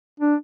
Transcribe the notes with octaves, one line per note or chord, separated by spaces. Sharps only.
D4